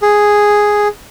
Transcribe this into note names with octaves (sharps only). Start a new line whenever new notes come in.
G#4